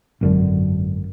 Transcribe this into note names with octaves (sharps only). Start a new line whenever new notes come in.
G#1 F#2 D3